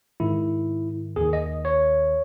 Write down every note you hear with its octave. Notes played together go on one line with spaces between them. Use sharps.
G#2 D#3 E4
D#2 D#3 G#4
D#5
C#5